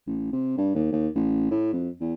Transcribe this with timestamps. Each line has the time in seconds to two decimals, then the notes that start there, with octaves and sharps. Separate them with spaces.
0.07 A1
0.32 C3
0.58 G2
0.75 D#2
0.92 D#2
1.15 A1
1.51 A2
1.73 F2
2.00 E2